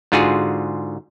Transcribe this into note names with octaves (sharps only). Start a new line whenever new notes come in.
G#2 D3 F4 F#4 G#4